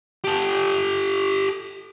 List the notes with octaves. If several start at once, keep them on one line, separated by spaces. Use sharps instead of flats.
G4 A4